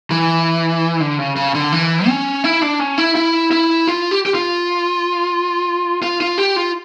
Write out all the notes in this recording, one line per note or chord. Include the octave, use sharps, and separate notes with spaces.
E3
D3
C#3
C#3
D3
E3
C#4
E4
D4
C#4
E4
E4
E4
F4
G4
G4
F4
F4
F4
G4
F4